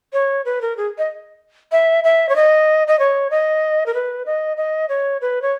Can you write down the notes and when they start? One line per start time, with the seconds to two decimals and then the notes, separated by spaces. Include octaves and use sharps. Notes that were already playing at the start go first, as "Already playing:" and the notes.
0.13 C#5
0.45 B4
0.62 A#4
0.77 G#4
0.98 D#5
1.72 E5
2.04 E5
2.29 C#5
2.36 D#5
2.88 D#5
2.99 C#5
3.31 D#5
3.86 A#4
3.94 B4
4.26 D#5
4.57 D#5
4.89 C#5
5.21 B4
5.42 C#5